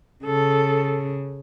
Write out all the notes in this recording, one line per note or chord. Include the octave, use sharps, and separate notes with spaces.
C#3 A4